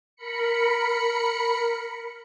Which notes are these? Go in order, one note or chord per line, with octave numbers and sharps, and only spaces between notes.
A#4 B5 C#7